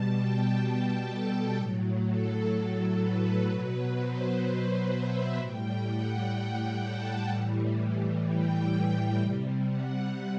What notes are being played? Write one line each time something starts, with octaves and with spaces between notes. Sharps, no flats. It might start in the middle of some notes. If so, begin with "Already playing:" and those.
Already playing: B2 G3 A5
G5
G5
A4
A2 F#3
A4
A4
B4
B2 F#3 B4
C5
E5
A2 G3 G5
F#5
G5
A5
A2 E3 G3
G5
C3 G3
F#5